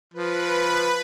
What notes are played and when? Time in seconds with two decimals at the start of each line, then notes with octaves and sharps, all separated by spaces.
0.14 F3 B4